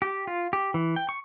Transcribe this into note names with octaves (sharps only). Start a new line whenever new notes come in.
G4
F4
G4
E3
G5
C#6